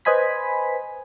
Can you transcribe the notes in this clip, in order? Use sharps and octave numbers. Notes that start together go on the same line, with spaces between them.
B4 C5 D#5 G#5 B5 B6